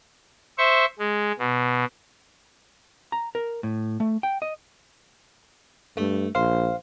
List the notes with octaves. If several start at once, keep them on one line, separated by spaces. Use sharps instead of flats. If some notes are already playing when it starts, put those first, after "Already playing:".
C5 E5 C#6
G#3
B2
A#5
A#4
A2
A3
G5
D#5
G2 A3
A#1 C5 F5